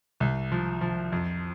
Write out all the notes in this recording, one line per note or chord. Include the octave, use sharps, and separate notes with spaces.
C2
F3
F3
F2